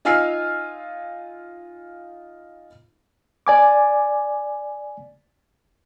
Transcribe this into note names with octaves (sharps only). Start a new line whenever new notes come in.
D#4 F4 G#5 E6 F6 C7
D5 G#5 D6